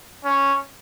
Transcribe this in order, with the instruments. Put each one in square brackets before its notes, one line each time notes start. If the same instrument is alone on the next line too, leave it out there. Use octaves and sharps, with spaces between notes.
[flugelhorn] C#4